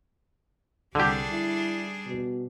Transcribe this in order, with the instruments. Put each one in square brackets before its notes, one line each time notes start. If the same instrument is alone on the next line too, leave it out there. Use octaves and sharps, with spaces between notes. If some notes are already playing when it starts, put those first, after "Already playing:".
[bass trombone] C2 [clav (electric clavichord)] D3 G4 [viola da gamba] G3 D4 G#4
[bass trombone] E4
B2